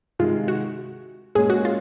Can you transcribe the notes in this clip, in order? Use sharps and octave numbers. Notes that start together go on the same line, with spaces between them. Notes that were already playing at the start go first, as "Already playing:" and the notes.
C3 D#3 G#3 F4
F#4
A#2 G#3 C#4 G#4
F#4
F4